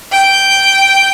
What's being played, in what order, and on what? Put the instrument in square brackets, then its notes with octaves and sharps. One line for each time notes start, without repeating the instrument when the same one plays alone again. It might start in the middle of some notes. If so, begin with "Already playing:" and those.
[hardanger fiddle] G5